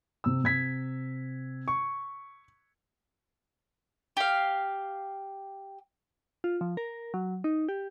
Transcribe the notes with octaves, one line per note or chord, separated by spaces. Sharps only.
C3 E6
C3 G#6 B6
C#6
G4 F5
F4
F3
A#4
F#3
D#4
G4